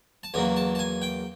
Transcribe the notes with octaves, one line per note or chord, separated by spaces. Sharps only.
A5
E2 C#3 F#3 A#3 G#5
A5
A5
G#5
G5